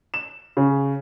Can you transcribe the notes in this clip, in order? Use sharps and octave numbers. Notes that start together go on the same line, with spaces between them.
E7
C#3